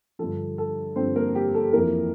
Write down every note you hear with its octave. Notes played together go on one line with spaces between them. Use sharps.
G2 D3 F3 A4
A4
G2 D3 F3 C4 C5
A#3 A#4
G4
A4
F2 E3 A#3 A#4